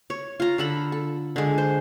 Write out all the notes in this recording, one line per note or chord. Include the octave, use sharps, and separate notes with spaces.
C#5
F4 A#5
D3 A4 B5
A4
D3 G#3
C5